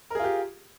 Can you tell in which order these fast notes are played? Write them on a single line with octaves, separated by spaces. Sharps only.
A#4 G#4 F4 G4